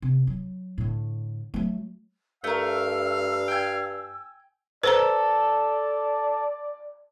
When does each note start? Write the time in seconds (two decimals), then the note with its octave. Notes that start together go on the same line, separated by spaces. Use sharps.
0.02 C3
0.27 F#3
0.78 A2 D3
1.54 F#3 A3
2.44 G2 A3 A#4 F5 E6
3.48 G5 G#5
4.83 A4 B4 C5 D5 A#5